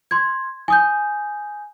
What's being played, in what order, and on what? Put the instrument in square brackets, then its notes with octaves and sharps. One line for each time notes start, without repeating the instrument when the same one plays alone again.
[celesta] C6 G#6
G#5 D#6 G6